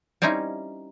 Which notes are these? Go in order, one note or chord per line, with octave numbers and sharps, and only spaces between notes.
G3 C4 C#4 D#4 E4